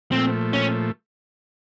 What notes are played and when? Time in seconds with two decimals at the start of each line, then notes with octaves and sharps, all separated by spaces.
0.12 A#2 F3 A3 C4
0.53 C#4